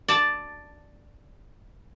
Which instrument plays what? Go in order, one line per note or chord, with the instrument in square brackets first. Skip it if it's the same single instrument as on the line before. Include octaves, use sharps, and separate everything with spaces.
[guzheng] D5 A5